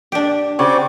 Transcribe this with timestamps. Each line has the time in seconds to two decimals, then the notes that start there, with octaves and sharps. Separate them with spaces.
0.12 D4 G4
0.59 C#3 C4 F#4 D5